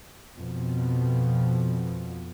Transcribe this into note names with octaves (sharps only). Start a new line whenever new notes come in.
F2 B2 F3